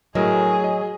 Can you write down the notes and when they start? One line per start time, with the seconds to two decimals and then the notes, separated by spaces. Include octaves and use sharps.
0.15 A2 F#3 G#4 A#4 D#5
0.64 D#5